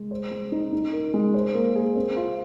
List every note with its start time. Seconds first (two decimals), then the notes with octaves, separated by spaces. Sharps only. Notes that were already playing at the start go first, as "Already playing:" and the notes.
Already playing: G#3
0.11 C5
0.31 G#3
0.52 D#4
0.73 D#4
0.93 A#4
1.14 G#3
1.34 C5
1.54 A#3
1.76 G#4
1.96 C4
2.16 F4